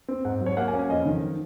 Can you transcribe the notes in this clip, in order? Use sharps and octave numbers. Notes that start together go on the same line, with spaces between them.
C4
G#2 F#5
F#3
C#5
A#3 F#5
G#5
C#4
G#5
F2 D#5
D#3
F#3